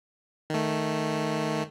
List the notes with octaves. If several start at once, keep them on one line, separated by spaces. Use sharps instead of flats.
D#3 A3